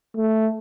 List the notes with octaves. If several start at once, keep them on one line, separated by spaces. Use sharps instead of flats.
A3